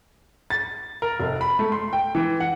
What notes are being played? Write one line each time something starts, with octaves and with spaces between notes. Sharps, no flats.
A6
A#4
F1
B5
A3
C6
G5
E3
F#5